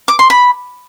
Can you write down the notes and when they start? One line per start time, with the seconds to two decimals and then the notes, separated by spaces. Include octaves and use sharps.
0.08 D6
0.19 C6
0.30 B5